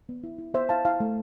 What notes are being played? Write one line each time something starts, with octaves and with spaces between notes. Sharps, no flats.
B3
E4
E4
B3 C5 E5
E4 F5 A5
E4 F5 A5
A3